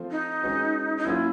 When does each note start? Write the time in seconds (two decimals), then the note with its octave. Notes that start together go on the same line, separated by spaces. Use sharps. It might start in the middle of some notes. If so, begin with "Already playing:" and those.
Already playing: F3 A3 C4 F4
0.11 D#4
0.42 G#3 C#4 F#4 B4 D#5
0.97 D#4
1.05 F#3 A#3 C#4 E4 F4